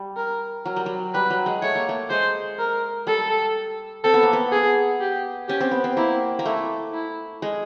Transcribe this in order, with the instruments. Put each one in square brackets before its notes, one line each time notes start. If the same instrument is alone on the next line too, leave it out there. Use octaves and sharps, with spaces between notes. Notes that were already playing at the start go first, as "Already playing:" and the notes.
Already playing: [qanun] G3
[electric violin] A#4
[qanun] F#3 [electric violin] A#4
[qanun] G3
F#3
[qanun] G3 [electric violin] B4
[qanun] F#3
G#3
[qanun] A3 [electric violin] C#5
[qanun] A#3
A3
[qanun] G#3 [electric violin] C5
[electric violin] A#4
[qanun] G3 [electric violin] A4
[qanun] C4 [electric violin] A4
[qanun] B3
A#3
B3
[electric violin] G#4
G4
[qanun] C#4 [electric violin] G4
[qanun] C4
B3
C4
[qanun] A#3 [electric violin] E4
[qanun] A#3
[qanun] A3 [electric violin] E4
[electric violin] E4
[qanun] G#3